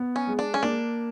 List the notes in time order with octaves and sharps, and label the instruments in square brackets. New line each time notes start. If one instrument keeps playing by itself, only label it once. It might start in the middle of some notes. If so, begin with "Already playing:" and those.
Already playing: [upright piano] B3
[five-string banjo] C#4
[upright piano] G#3
[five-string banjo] D4
C#4
[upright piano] A#3 [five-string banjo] D4